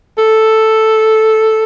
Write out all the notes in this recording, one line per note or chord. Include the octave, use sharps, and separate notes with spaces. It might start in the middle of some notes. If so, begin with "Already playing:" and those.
A4